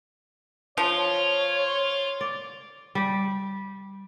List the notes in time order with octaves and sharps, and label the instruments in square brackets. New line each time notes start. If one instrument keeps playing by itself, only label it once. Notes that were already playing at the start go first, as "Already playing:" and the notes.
[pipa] F3 [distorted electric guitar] F4 [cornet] C#5
[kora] D5
G3